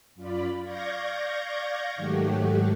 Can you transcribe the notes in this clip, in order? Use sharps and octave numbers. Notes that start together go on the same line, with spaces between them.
F#2 F4 D5 B5
D5 F5 C#6 G6 G#6 A#6
G#2 D#3 F#3 A3 F#4 G4